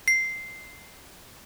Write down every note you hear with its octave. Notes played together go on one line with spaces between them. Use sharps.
C7